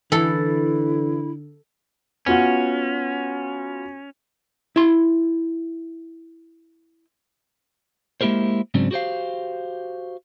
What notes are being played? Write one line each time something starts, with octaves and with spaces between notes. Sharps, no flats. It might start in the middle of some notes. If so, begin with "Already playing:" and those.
D3 E3 E4 A4
B3 C#4 F4 F#4
E4 C6
G#3 A#3 E4 G4 A#4 C5
G#2 C#3 F#3 C4 D4
F#4 G4 C5 F5